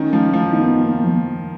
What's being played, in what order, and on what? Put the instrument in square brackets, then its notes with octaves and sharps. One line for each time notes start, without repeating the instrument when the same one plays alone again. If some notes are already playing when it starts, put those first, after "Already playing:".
Already playing: [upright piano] D#3 [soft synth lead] C#4
[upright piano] F3
F3
[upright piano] D#3 [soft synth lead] B3
[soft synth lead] A#3
F3